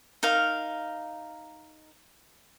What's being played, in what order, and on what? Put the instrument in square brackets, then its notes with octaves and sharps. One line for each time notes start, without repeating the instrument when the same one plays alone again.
[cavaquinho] D#4 A#4 F5